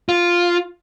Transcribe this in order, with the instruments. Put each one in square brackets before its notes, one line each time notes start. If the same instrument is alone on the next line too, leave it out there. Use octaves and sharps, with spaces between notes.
[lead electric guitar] F4